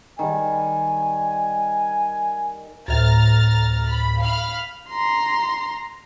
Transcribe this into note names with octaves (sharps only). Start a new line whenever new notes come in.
D#3 G3 G#5
D2 A2 A#5 F6 A6
B5
F5 B5 F6
A#5 C6